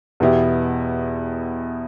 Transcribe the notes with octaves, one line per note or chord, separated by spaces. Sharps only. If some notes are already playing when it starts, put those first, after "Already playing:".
E2 B2 B3 E4 G4